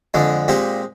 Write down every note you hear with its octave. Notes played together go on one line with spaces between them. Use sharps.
F2 D3 G#3
A#2 G#3 C4 G4